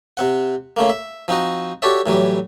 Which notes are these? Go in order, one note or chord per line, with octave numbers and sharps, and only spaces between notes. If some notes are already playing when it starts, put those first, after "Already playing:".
C3 C4 F#5
C#3 A3 A#3
E5
F3 C4 D#4 F#4 D#5
F#4 G4 A4 C#5 D5 E5
A2 E3 F#3 G3